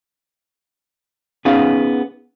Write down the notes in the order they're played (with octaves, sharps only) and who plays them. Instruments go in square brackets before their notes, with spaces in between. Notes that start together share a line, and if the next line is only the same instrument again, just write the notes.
[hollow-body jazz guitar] B3 C#4 D#4 G#4 F5